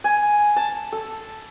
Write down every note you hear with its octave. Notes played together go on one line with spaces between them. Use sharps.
G#5
A5
A4